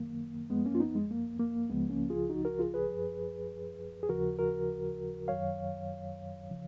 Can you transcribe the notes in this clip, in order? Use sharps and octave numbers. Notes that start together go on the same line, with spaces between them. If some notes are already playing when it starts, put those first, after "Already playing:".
Already playing: F#2 D#3 F#3 A#3
F#2 F3 G#3 B3
A#3 C#4
F4
B3 D#4
G#3
A#3
A#3
C#2 C#3 F3 G#3 B3
A#3 C#4
F4 G#4
D#4 F#4
F#4 A#4
F4 G#4
G#4 B4
F#2 F3
G#4
D#2 C#3 F3 F#4 A#4
F#4 A#4
F#2 D#3 F#3 C#5 F5
C#3 F3